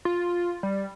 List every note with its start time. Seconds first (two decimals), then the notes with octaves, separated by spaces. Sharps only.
0.05 F4
0.63 G3